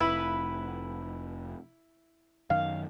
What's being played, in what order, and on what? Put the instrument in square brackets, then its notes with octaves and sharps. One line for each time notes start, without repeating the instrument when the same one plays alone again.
[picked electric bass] F1 [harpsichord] E4 [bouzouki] B4
[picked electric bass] F#2 D#3 [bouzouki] F5